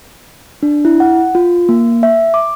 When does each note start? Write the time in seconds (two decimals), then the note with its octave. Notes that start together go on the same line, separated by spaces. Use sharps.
0.63 D4
0.85 E4
1.00 F#5
1.35 F4
1.69 A#3
2.03 E5
2.34 D6